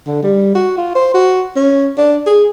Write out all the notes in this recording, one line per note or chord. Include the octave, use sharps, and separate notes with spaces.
D3
G3
F#4
F4
C5
F#4
C#4
D4
G#4